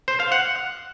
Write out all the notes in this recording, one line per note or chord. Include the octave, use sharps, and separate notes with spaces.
C5
F5
F#5